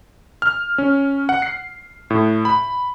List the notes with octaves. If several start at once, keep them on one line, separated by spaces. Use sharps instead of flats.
F6
C#4
F#5
C7
A2
B5